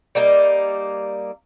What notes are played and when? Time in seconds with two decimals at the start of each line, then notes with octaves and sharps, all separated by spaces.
0.15 G3 A#3 D#4